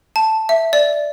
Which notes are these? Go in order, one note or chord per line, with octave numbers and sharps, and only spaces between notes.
A5
E5
D5